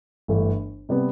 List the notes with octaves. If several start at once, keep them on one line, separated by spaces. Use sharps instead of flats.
G1 G2 E3 A3
C3 G3 B3